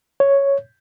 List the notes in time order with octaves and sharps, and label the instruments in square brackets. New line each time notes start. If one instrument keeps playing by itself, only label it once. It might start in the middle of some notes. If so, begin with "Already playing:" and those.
[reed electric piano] C#5